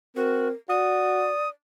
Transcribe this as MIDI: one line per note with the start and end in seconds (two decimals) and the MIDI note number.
0.16 0.51 60
0.16 0.48 66
0.16 0.48 70
0.69 1.30 66
0.69 1.43 74
0.69 1.49 87